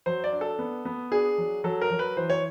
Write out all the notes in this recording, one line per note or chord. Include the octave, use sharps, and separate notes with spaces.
F#3 C5
D5
D4
A4
B3
B3
D4 G#4
F#3
F#3 A4
A#4
F#3
B4
E3 C5
C#5